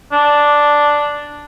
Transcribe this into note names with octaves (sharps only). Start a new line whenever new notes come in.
D4